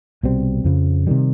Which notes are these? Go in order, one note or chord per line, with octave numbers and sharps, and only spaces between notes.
C2 B2 G3 C4
F2 C#3 F3
C3 D#3 G3